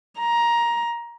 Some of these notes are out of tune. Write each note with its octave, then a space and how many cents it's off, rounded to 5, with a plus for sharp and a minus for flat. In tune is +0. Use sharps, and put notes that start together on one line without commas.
A#5 +15